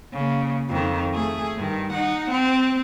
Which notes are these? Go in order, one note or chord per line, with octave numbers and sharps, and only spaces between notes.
C#3 A#3
F2 D#3
A3 G#4
G2 D#3
D#4 F#5
C4